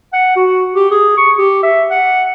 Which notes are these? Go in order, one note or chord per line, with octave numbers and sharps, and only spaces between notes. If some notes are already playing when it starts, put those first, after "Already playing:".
F#5
F#4
G4
G#4
C#6
G4
E5
F#5